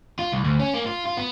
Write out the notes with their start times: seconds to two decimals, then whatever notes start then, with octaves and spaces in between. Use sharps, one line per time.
0.19 F4
0.32 C2
0.44 D2
0.59 C#4
0.74 A#3
0.86 F4
1.05 F4
1.17 B3